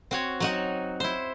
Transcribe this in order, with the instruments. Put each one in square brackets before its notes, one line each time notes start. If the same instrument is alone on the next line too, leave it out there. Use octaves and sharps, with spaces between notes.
[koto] C4 F#4 C#5
F#3 D#4 F#4
E4 C5